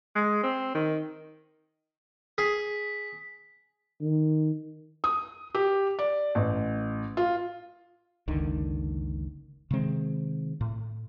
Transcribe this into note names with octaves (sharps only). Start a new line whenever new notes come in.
G#3
C4
D#3
G#4 B6
D#3
D#6
G4
D5
A1
F4
F#1 C#2 D3 D#3
C3 D#3 G#3 C4
A2